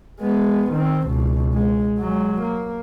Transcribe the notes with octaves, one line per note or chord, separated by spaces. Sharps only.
G#3 B3
D#3 C4
C#2 B2
G#3
F#3 G#3
A#3